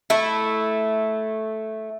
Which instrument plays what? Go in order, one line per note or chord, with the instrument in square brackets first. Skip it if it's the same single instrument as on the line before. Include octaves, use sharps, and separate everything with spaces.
[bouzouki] A3 E4